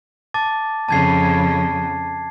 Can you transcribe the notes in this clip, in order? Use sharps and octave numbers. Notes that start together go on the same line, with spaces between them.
A5 D6 A6
F2 C#3 A5 G#6 C7